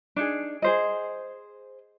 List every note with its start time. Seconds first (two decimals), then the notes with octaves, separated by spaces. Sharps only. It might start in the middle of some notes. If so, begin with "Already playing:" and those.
0.16 D4 D#4 G#4
0.62 G#4 C5 D#5